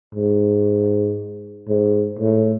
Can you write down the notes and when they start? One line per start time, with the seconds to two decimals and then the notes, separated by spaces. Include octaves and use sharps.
0.15 G#2
1.68 G#2
2.19 A2